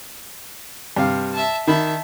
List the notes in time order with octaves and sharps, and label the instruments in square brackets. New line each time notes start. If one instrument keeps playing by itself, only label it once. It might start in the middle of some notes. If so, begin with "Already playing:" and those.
[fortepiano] G2 C3 F5
[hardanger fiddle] E5 A5
[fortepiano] D#3 B5 [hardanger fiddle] E5 A5